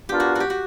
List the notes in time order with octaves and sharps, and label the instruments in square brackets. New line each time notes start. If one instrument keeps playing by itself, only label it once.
[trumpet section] B3 D4 F4 A#4 [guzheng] G4
[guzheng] F#4
F#4 G4
F#4